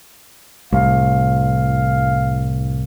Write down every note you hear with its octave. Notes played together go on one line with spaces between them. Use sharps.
C2 A2 F5